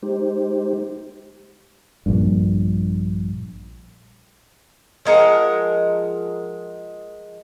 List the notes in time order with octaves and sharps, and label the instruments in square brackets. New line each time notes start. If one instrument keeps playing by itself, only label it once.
[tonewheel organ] G#3 D#4 G4 C5
[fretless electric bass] A#1 G2
[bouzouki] F3 G#3 A#4 F#5